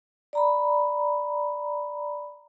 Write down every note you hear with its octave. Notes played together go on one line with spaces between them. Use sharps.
D5 A#5 B5